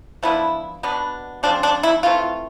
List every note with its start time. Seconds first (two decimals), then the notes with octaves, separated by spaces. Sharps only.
0.23 F3 B3 D4 E4
0.83 B2 B3 D4
1.43 F3 G#3 C4 D4
1.63 D4
1.83 E4
2.03 E3 A3 C4 F4